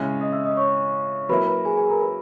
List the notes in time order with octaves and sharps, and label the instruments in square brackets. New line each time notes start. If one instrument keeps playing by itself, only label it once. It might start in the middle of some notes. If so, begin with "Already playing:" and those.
Already playing: [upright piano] C#3 G#3 C#4 E4
[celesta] D#5 D#6
E5 E6
D#5 D#6
C#5 C#6
[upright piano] F#3 A#3 E4 [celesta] B4 B5
[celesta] B4 B5
G#4 G#5
G#4 G#5
A#4 A#5
B4 B5